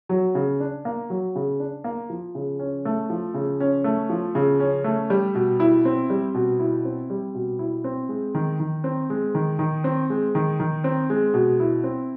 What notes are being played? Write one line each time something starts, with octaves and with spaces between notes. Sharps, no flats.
F#3
C#3
D4
A#3
F#3
C#3
D4
A#3
F3
C#3
C#4
A3
F3
C#3
C#4
A3
F3
C#3
C#4
A3
G3
B2
E4
C4
G3
B2
E4
C4
G3
B2
E4
C4
G#3
D#3
D#3
C4
G#3
D#3
D#3
C4
G#3
D#3
D#3
C4
G#3
B2
E4
C4